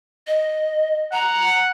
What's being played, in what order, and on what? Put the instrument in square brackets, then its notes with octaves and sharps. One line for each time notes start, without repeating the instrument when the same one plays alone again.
[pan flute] D#5
[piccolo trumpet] F#5 [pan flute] A#5